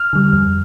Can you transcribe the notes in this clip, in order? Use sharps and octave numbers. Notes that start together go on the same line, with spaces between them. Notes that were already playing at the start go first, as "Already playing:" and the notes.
Already playing: F6
D3 G3
F2